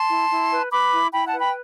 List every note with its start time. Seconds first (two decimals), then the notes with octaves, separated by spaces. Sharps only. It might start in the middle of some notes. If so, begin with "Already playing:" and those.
Already playing: A5 C6
0.09 E4
0.30 E4
0.50 B4
0.71 B4 B5 D6
0.92 E4
1.12 E4 G5 B5
1.26 F#5 A5
1.33 B4
1.40 G5 B5